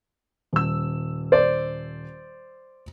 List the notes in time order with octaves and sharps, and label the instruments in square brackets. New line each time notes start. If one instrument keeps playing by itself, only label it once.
[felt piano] D#1 E6
[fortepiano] C5 D5